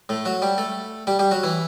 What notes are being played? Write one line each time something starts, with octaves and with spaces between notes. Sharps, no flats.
A2 A3
F#3 F#4
G3 G4
A3 A4
G3 G4
G3 G4
F#3 F#4
E3 E4